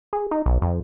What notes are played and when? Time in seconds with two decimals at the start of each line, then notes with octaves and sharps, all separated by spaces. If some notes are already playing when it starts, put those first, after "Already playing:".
0.13 G#4
0.31 D#4
0.46 B1
0.62 F2